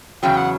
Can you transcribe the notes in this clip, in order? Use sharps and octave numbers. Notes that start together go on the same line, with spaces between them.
E2 C#3 F#3 G5
F#5